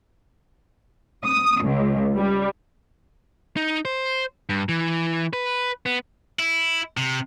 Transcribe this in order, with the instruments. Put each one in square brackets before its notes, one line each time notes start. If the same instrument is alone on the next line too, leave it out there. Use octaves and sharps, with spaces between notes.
[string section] D#6
C#2
G3
[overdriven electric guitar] D#4
C5
G2
E3
B4
B3
[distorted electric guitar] E4
C3